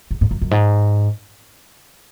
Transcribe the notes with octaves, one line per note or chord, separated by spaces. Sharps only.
G#2
G#2
F#2
F#2
G#2